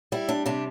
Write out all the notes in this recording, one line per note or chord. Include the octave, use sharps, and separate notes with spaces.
G3 E4
D4
C3 D4